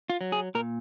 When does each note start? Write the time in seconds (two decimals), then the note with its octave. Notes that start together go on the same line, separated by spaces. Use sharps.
0.10 F4
0.21 F#3
0.32 G#4
0.55 A#2 A#4